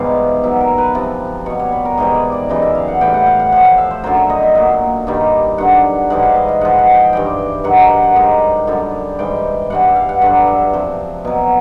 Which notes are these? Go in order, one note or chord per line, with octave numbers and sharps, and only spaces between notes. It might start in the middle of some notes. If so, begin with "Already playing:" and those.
Already playing: G#2 B2 E3 G3 F5
B2 F#3 E5
A#4
B4
C3 F3
B2 G3 C#5
C#5
B4
A#4
G#2 E3 G3 D#5
D5
D5
F#2 C#3 E3 G3 D#5
E5
F5
F#5
A2 E3 G3 G5
F#5
F5
F#5
A2 F3 F#5
F5
E5
C5
F#2 D3 F#3 C5
C#5
D#5
E5
A#2 F#3 F5
G2 D#3 G3
G2 D3 F#3 F#5
G#2 E3 G3 F#5
F5
D#5
F5
G#2 F3 F#5
F#5
G5
G2 E3 G3 G5
G2 D#3 F#3 F#5
G5
F#5
F#5
G#2 D#3 G3
F#2 D3 G3
G#2 E3 G3 G5
G2 E3 G3 F#5
E5
F5
F#5
G2 D3 F#3 F#5
E5
C3 F3
B2 F#3